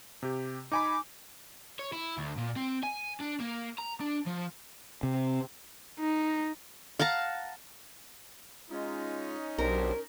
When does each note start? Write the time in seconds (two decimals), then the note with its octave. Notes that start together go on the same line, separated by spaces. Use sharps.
0.23 C3 G4
0.72 D#4 G#5 B5 D6
1.79 C#5
1.93 E4
2.18 D2
2.37 A#2
2.57 C4
2.83 G#5
3.21 D4
3.41 A#3
3.78 A#5
4.01 D4
4.27 F3
5.03 C3
5.99 D#4
7.00 F5 F#5 A5 A#5
8.70 G#3 C#4 D#4 F4
9.58 B1 D4 G4 A#4 C5